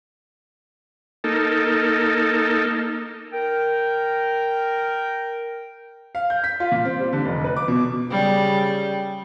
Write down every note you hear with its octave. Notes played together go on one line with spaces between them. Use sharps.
A#3 D#4 A4
A#4 G5
F5
G6
B6
F4
A#2
C4
G3
D3
F1
B4
D6
B2
C#3 G3